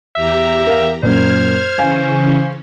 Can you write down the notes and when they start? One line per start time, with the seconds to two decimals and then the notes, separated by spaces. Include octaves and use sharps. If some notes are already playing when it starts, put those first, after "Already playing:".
0.16 E2 G4 E5 A#5
0.67 A#4 F5
1.03 F#2 A#2 C5 F6 G#6
1.78 C#3 E3 C#4 F5 G#5